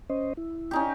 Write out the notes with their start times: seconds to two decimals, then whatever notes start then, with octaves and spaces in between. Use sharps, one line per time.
0.10 C#4 C5 D#5
0.37 E4
0.71 C#4 D#4 G4